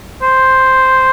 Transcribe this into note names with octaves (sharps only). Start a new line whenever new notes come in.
C5